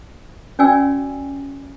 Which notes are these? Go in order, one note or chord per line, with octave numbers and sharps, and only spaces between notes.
C#4 F#4 D5 G5 G#5 E6